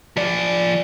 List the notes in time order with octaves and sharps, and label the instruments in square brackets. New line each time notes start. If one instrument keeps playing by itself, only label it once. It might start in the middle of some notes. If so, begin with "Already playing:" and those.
[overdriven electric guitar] F3 D5